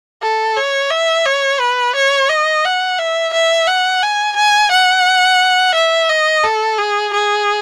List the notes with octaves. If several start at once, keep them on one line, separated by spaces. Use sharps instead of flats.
A4
C#5
E5
C#5
B4
C#5
D#5
F#5
E5
E5
F#5
G#5
G#5
F#5
E5
D#5
A4
G#4
G#4